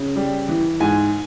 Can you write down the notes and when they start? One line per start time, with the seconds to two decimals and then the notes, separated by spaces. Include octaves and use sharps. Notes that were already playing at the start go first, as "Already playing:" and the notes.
Already playing: C#3
0.16 G3
0.49 E3
0.80 G#2 G#5